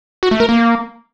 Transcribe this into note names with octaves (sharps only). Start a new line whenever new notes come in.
F#4
A3
A#4
A#3